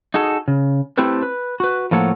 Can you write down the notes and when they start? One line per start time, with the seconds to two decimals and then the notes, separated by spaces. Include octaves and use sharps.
0.14 D#4 F#4 G#4 A4
0.48 C#3
0.98 A3 C4 E4 G4 A4 B4
1.22 B4
1.60 F#4 B4
1.91 A2 F3 A#3 A4 C#5 F#5